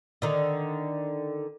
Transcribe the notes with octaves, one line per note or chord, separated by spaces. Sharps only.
D3 D#3